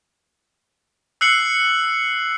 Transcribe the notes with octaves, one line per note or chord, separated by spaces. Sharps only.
E6 F#6 C7 C#7 F#7